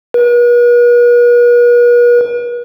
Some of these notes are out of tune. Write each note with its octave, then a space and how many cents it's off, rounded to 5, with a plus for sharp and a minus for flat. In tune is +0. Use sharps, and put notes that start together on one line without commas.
B4 -45